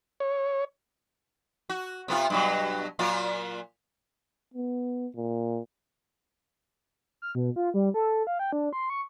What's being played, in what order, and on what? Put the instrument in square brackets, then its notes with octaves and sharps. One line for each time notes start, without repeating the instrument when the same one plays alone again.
[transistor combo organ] C#5
[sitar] F#4
C3 B3 F4
G2 B2 F#3
A#2 F#3 F4
[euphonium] B3
A#2
[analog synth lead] F6
B2
F4
G3
A4
F5
G5
D4
C6
C#6